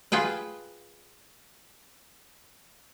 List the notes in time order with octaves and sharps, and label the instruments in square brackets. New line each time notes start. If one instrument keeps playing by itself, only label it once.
[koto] F4 G#4 B4 G5